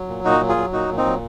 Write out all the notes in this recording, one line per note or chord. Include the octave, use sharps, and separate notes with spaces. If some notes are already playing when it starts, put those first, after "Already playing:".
Already playing: F#3
A#2
A#2 D#4 F#4
F#3
F4 G#4
F#3
A#2 D#4 F#4
A#2
C4 D#4
F#3